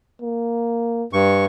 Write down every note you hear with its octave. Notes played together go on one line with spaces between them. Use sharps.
A#3
G2 C#6